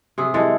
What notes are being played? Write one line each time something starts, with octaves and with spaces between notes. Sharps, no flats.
C3 G#4
E3 G#3 A4